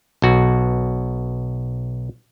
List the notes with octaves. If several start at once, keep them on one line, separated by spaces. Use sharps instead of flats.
B1 F#4